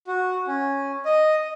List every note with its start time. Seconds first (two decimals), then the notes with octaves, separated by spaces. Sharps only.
0.07 F#4
0.47 C#4
1.05 D#5